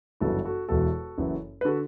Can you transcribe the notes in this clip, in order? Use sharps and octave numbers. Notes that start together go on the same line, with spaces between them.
G1 F#2 C#3 E3 F#4 A4
F#4 A4
E1 E2 B2 F#4 A4
F#1 F#2 E3
B4
D3 F#4 A4